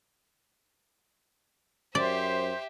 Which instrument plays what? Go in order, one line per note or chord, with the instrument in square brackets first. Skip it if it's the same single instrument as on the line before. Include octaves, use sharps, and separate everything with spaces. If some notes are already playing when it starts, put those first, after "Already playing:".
[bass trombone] F#2 [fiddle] G4 E5 [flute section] C5 [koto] D5